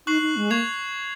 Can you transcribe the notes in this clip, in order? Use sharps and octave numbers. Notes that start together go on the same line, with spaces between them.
D#4 C#6 F#6 C7 F#7
D#4
G#3
A#3 C#6 G#6 C7 F7